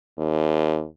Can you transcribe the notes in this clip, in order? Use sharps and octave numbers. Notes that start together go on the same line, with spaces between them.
D#2